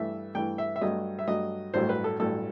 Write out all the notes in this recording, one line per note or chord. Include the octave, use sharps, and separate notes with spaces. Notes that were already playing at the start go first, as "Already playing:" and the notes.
Already playing: G2 E3 A3 E5
G2 E3 A3 G5
E5
E5
G2 F#3 A3 D#5
E5
G2 F#3 A3 D#5
A1 G2 F#3 A3 C5
B4
A4
A1 G2 F#3 A3 A4